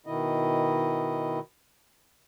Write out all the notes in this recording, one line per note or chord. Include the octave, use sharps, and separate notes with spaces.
B2 D#3 E4 D#5